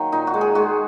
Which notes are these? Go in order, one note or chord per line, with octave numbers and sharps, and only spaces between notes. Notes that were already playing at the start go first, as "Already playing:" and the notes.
Already playing: D#3 F#3 A#3
A#2 D#4
F#4
G#3
G#4
G#3 F#4